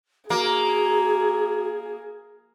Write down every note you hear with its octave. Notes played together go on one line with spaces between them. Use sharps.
A#3 F#4 G#4